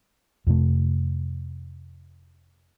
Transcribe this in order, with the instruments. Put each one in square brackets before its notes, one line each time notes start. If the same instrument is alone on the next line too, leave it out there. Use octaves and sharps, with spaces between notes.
[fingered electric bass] F2 C3 A3